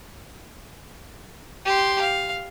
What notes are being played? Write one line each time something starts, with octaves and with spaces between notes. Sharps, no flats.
G4 C6
F5